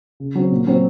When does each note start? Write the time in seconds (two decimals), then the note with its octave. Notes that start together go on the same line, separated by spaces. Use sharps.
0.20 C#3
0.35 F#3 C4
0.52 A#2
0.67 F#3 C4 F#4